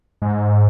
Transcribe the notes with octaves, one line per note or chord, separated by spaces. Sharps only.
G#2